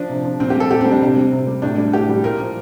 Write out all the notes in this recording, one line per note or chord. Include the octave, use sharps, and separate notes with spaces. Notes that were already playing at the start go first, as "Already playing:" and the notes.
Already playing: F3 D4
C3
F3
A#2 C4
G4
G3 A4
A#2 G4
G3 C4
D4
C3 C4
G3
C3
G3
A2 D4
G3
A2 G4
G3
A#2 A#4
F3